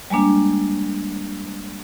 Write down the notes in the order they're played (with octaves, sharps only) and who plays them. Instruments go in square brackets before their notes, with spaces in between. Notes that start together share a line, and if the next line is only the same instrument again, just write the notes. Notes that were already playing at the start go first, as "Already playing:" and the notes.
[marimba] G3 G#3 A#3 D4